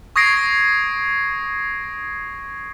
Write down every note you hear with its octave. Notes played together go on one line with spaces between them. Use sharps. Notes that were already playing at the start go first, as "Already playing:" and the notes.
C#6 D#6 G#6 A#6 C7 D7